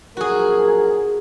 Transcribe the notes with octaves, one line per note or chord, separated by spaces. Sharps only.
A#1 F#3 F#4 G#4 A#4